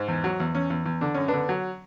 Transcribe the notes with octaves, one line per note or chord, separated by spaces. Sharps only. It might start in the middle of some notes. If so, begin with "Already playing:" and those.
Already playing: G#2
E2
F#3
E2
E2 C#4
E2
E2
D3 D4
F#2 C#4
B3 D4
D3
F#3